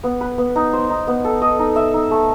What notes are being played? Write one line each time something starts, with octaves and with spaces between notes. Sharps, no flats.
B3
B4
B3
D#4
C5
D#4
B3
A4
D#5
D#4
E5
D#4
A3